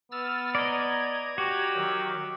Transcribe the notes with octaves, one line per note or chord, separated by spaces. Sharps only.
B3 E6 F6 A6
D5 D#5 A#5 G#6
F#4 G4
D#3 F#3